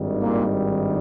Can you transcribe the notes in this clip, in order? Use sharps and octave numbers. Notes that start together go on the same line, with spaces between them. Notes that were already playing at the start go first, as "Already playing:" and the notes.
Already playing: G#1 G2 D#3 G3
A#2 A#3